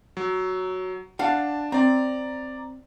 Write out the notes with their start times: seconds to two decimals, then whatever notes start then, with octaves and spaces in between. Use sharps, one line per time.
0.17 F#3
1.19 D4 F5 F#5 A5
1.72 C4 D5 A#5